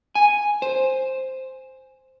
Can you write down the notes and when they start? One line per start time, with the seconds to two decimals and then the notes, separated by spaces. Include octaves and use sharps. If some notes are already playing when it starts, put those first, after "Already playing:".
0.15 G#5
0.62 C5